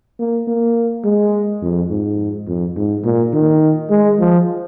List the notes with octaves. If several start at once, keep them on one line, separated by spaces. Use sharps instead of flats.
A#3
A#3
G#3
F2
G#2
F2
G#2
A#2
D#3
G#3
F3